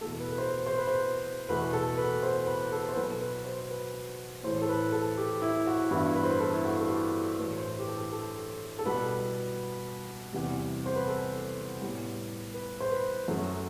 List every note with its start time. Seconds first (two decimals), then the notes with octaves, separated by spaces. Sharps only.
0.01 A3 A4
0.04 E2 B2
0.20 B4
0.31 B4
0.38 C5
0.66 C5
0.78 B4
0.88 C5
1.49 E2 B2 A3 B4
1.73 A4
1.98 B4
2.23 C5
2.47 B4
2.72 A4
2.89 C5
2.96 B2 F#3 B3 B4
3.21 B4
3.45 C5
3.71 B4
4.43 A2 E3 A3 C5
4.62 A4
4.69 B4
4.92 A4
5.17 G4
5.42 E4
5.67 F#4
5.91 G2 E3 B3 E4
6.15 B4
6.23 C5
6.31 B4
6.40 A4
6.53 E4
6.65 F#4
6.79 A4
6.89 G4
7.39 A2 E3 A3 B4
7.57 C5
7.64 B4
7.79 G4
7.88 A4
8.12 A4
8.79 A4
8.85 B2 G3 B3 B4
10.33 E2 C3 G3
10.86 C5
10.96 B4
11.07 A4
11.81 A2 G3 B3
12.54 B4
12.80 C5
12.92 B4
13.28 F#2 F#3 A3